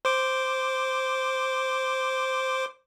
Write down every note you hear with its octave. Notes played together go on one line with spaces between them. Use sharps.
C5 D6